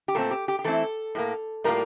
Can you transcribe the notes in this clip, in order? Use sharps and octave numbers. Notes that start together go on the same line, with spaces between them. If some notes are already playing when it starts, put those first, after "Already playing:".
G4
A#2 A3 C4 A4
G4
G4
G4
E3 A3 C4 E4 A4
A2 G3 A#3
A2 G3 A#3 F4 A#4